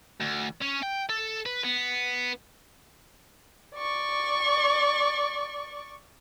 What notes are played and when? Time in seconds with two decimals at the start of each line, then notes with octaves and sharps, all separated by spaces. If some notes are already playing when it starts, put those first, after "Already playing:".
0.21 D2
0.62 C#4
0.83 G5
1.10 A4
1.46 B4
1.65 B3
3.76 D5 C#6